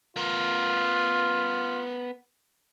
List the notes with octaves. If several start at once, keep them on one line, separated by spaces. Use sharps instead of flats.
B3 F4 A#4